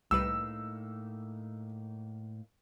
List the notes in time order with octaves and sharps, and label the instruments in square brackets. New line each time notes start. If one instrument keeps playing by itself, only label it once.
[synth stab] C2 G3 B4 [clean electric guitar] A2 A#3 D#4 [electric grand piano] E6